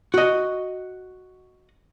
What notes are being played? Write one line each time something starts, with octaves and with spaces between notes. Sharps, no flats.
F#4 D#5